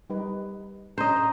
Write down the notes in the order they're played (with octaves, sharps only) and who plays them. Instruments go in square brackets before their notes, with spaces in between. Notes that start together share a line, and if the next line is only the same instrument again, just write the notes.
[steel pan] G3 D#4 B4
[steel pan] C#4 D4 [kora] C5 D#5 [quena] A#5